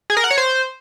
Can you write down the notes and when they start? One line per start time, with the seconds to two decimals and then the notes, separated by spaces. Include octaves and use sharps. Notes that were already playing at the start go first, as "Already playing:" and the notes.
0.10 G#4
0.17 A#4
0.24 F#5
0.31 C#5
0.38 C5